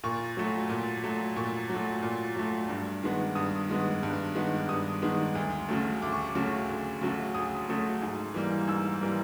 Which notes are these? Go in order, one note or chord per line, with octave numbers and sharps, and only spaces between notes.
A#2 C#6
F#3 A3
A#2
F#3 A3
A#2 C#6
F#3 A3
A#2
F#3 A3
G2
D#3 G#3 B3
G2 D#6
D#3 G#3 B3
G2
D#3 G#3 B3
G2 D#6
D#3 G#3 B3
D2
C#3 F#3 A3
D2 D6
C#6
D6
C#3 F#3 A3
D2
C#3 F#3 A3
D2 D#6
C#3 F#3 A3
G#2
E3 G3 A#3
G#2 E6
E3 G3 A#3